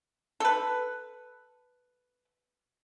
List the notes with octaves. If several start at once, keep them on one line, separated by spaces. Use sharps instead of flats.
A4 B4